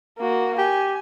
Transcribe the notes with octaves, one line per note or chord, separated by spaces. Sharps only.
A#3 F#4
G4 G#5